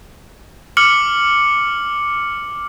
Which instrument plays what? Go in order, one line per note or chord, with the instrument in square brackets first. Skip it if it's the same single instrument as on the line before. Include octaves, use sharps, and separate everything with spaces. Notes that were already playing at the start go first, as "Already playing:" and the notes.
[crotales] D6 F6 C#7 F#7